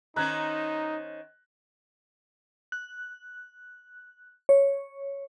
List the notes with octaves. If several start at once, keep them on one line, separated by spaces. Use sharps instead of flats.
D#3 C#4 D#4 C5 A#5 F#6 G#6
F#6
C#5